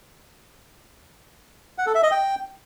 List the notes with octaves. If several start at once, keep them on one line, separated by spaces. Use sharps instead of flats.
F#5
A4
E5
D#5
G5